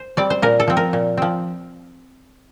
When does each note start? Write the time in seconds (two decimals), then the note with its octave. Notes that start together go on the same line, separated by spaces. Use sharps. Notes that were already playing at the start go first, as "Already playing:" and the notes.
Already playing: C5
0.17 G3 C4 D5
0.30 C5
0.42 A#2 A#4
0.60 A4
0.68 F3 C4
0.77 A#4
0.93 A#2
1.17 F3 C4